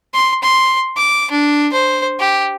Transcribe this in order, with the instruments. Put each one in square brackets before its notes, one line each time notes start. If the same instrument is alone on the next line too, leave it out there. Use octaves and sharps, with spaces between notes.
[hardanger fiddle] C6
C6
D6
D4
C5
G4